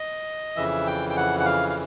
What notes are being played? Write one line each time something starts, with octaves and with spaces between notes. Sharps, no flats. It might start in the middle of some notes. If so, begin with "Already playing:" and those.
Already playing: D#5
F2 C#3 E3 E5
G5
G5
F#5
F#5
F5
F5